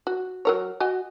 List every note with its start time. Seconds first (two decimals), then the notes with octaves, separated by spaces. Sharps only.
0.07 F#4
0.45 F#3 A#4 C#5
0.80 F#4 D#5 G#5